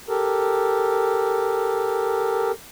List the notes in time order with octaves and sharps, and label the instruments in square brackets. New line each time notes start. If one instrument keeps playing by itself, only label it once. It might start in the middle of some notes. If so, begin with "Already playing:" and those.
[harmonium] G4 A4 A#4